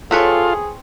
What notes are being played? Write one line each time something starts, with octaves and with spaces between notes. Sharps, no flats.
C4 F4 G#4 A4 B4 C#5